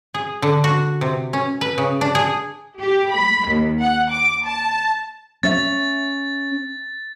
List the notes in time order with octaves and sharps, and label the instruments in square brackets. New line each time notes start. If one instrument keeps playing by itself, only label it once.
[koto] G#4
D3
F#4
C3
C#4
B4
C#3
D4
G#4
[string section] G4
B5
D#2
F#5
D6
A5
[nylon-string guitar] C#4 E5 [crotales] A6